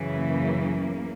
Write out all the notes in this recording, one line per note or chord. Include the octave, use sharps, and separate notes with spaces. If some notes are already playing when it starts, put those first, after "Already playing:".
Already playing: F#2 C#3 E3
A#3